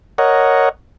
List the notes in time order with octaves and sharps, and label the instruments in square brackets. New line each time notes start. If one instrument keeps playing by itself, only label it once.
[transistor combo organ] A#4 C#5 D#5 F#5